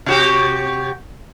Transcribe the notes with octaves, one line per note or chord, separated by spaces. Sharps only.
C3 F#4 G4